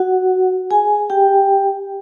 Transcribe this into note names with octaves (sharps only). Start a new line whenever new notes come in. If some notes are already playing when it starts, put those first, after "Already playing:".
Already playing: F#4 F#5
G#4 G#5
G4 G5